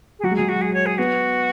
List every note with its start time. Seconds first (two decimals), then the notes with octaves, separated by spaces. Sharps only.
0.19 G#4
0.23 F#3 F#4
0.31 G#3
0.35 F#3 G#4
0.48 F#4
0.61 G#4
0.73 C#5
0.86 G#4
0.98 B3 F#4